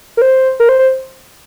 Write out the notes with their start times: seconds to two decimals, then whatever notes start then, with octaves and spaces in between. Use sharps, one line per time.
0.17 A#4
0.22 C5
0.60 A#4
0.69 C5
0.79 C5